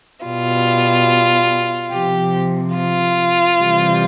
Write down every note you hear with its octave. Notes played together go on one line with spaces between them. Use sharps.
B2 G3 F4
C3 F3 G4
F4
C3 E3 G3